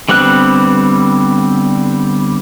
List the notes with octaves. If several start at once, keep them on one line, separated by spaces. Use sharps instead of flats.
D3 G3 B3 C4 F#6